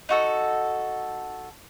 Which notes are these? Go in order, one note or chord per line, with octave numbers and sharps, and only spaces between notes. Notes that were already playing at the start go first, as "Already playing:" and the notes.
D#4 F#4 A4